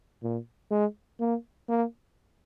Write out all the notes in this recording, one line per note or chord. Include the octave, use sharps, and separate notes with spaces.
A#2
G#3
A#3
A#3